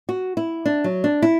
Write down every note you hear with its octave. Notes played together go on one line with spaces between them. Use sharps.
F#4
E4
D4
F#3
D4
E4